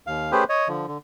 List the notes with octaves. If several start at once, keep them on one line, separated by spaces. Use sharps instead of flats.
D#2 F5
A3 C#4 G4 G#4 B4 C5
C#5 D#5
D3 F3
D3